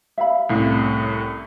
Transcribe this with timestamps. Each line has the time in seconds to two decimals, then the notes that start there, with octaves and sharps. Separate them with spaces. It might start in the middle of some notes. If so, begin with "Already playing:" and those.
0.18 E5 F5 B5
0.49 C2 A2 C#4